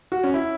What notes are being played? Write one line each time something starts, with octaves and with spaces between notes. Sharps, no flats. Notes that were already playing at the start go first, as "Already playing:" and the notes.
F#4
C#4
E4